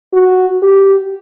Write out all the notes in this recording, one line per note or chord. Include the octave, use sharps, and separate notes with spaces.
F#4
G4